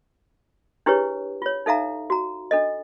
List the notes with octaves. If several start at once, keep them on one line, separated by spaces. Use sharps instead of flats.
D4 E4 G4 G#4 B4 C#5
F4 C#5
D#4 A4 E5 F5 A#5
F#4 A#5
D4 A4 D#5